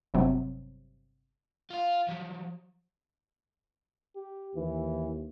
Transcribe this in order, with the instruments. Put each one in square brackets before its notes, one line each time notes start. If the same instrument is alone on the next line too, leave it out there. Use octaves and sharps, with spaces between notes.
[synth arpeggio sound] G1 C3 F#3
[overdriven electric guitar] F4 F5
F3 F#3
[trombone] G4
[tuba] D#2 [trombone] E3